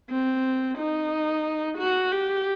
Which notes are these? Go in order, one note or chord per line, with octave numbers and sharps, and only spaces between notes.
C4
D#4
F#4
G4